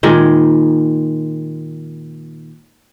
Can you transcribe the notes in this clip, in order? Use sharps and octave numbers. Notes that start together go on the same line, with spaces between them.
A#2 D#3 G#3